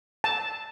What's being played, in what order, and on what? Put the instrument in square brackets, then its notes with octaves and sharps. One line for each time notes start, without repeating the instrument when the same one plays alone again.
[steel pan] A5